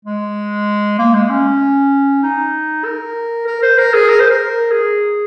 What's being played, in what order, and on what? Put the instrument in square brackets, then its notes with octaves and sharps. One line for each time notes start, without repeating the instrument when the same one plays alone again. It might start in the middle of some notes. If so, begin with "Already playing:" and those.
[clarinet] G#3
A#3
G#3
C#4
D#4
A#4
A#4
C5
A#4
G#4
A#4
C5
A#4
G#4